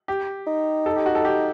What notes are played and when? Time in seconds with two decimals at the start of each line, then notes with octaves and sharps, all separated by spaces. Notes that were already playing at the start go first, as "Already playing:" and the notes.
0.08 G4
0.47 D#4
0.86 A4
0.96 G4
1.06 F#4
1.15 A4
1.25 G4